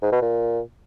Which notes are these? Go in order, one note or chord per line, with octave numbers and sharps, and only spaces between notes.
G#2
B2
A#2